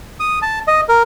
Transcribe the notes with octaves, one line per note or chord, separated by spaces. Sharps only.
D#6
A5
D#5
A#4